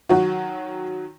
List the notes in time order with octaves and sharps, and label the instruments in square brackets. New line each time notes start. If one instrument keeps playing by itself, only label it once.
[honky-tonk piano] D#3 F#3 [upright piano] F#4 F#5